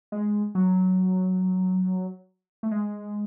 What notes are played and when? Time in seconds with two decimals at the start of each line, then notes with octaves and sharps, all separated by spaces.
0.12 G#3
0.55 F#3
2.63 A3
2.71 G#3